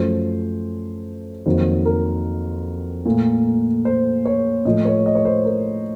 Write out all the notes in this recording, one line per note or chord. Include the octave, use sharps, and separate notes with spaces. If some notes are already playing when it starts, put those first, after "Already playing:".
Already playing: F#2 F3 A3 C5
F2 D#3 F#3 A#3 C5
A#4
A#2 A3
C5
C#5
A2 F3 A3 D#5
C#5
D#5
C#5
C5
A#4